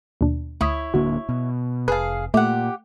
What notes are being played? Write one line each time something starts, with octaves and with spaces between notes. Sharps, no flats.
D#2 B2 D4
D2 E4 C#5 D#6 B6
D1 D3 A#3 F#4
B2
F1 G#4 B4 F5 A5
A#2 A3 G4 F#5